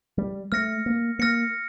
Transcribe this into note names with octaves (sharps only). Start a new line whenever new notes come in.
G3
A3 F6 A#6 C#7
A#3
A#3 F6 A#6 C#7